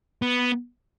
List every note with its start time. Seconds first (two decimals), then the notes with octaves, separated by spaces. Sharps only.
0.22 B3